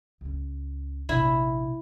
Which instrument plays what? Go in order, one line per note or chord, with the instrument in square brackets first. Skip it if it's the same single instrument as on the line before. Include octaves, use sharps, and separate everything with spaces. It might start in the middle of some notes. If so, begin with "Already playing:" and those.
[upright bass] C#2 C#4
[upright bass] A#1 C3 [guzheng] E4